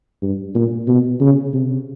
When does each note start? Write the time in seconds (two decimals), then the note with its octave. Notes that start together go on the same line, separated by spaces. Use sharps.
0.22 G2
0.55 A#2
0.88 B2
1.21 C#3
1.54 C3